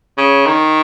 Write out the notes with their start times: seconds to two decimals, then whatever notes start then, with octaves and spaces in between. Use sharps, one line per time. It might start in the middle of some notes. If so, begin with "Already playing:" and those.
0.18 C#3
0.46 D#3